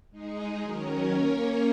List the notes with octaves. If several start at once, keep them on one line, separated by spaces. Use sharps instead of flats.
G#3 D#4 G#4
D#3 F#3 C#4 A#4 C#5
A#3 C#4 A#4 C#5